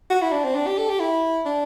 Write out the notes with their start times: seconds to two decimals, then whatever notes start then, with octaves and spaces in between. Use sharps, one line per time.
0.10 F#4
0.21 E4
0.32 D4
0.44 C4
0.55 D4
0.67 G4
0.78 A4
0.89 G4
1.00 E4
1.46 D4